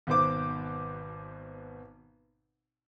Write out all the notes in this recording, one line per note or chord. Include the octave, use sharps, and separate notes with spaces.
G#1 B2 B3 C5 D6